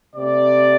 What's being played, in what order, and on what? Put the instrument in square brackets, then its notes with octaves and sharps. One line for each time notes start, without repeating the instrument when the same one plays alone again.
[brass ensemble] C3 A3 D5